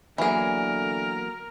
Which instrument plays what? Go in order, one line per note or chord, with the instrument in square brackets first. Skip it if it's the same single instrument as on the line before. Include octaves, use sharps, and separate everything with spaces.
[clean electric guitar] E2 F#3 A#3 [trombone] D3 [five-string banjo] E3 G#4 [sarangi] A#4